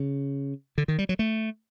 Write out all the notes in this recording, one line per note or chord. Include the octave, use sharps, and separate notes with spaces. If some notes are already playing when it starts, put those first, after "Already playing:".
Already playing: C#3
D3
D#3
G3
F#3
A3